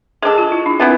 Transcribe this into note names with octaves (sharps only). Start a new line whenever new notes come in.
G#3 D4 G#4 A4
F4
E4
D4
E3 B3 C4 E4